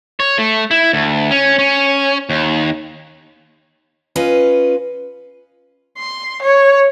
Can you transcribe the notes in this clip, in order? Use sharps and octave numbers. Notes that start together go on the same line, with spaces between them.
C#5
A3
E4
D2
C#4
C#4
D#2
C#4 F4 B4 D#5
C6
C#5